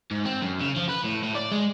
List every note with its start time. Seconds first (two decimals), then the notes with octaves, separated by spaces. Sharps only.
0.11 G#2
0.25 C4
0.42 F#2
0.60 C#3
0.76 F3
0.89 B4
1.04 A2
1.23 A2
1.35 D5
1.52 G#3